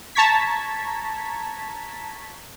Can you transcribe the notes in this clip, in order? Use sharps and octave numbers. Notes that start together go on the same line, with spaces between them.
A5 A#5 C#6 G#6 B6